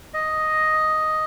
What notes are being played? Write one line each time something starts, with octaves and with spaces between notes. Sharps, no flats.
D#5